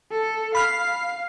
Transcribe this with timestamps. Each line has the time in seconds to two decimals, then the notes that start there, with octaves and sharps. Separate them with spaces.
0.11 A4
0.55 F5 B5 F6